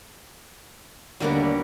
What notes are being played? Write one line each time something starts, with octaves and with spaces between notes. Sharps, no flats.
D#2 D3 F#3 G3 A#3 B3 D4